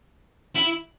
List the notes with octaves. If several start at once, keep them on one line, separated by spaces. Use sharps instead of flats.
E4